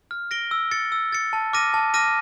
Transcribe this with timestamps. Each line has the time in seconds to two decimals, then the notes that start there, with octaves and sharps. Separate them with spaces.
0.11 F6
0.31 A#6 D7 G7
0.51 E6
0.71 A6 C#7
0.92 E6
1.13 A6 C#7
1.33 A5
1.53 D6 F6 A#6 D#7
1.74 A5
1.94 D6 F6 A#6 D#7